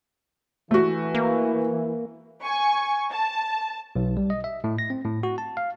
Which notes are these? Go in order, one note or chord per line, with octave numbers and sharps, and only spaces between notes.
E3 A3 F#4
A#3
G#5 C#6
A5
B1
G3
D#5
E5
A2
A#6
C4
A2
F#4
A5
F5